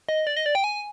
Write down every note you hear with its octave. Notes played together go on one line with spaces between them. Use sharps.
D#5
D5
D#5
D5
G5
G#5